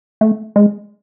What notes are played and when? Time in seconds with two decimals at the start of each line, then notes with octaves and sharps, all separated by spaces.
0.21 A3
0.56 G#3